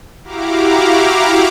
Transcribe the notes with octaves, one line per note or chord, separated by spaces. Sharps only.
E4 F#4 G4 F5 A#5 D6